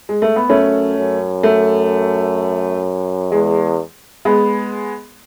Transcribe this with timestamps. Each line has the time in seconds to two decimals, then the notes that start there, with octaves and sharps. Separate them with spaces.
0.09 G#3
0.22 A3
0.36 B3
0.49 F#2 A3 C#4
0.97 F#2
1.43 A3
3.31 E2 G#3
4.25 G#3 B3